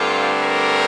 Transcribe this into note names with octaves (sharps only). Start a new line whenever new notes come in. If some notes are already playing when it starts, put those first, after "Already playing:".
Already playing: G2 D3 A3 C4 F4
A#4